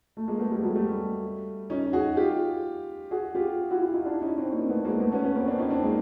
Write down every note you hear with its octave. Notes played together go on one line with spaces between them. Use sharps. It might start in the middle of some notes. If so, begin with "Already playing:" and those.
A3
G#3 A#3
A3 B3
G3 A3
F#3 G#3
G3 A3
C#4 D#4
F#4 G#4
F4 G4
F#4 G#4
F4 G4
E4 F#4
E4 F#4
D#4 F4
D4 E4
C#4 D#4
C4 D4
A#3 C4
A3 B3
G#3 A#3
A3 B3
B3 C#4
B3 C#4
A#3 C4
C4 D4
C#4 D#4
C4 D4
G#3 A#3